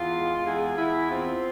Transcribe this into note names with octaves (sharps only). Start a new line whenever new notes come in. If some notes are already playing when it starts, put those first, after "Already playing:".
Already playing: E2 F4
G#3
E2 G#4
E2 E4
C4 F4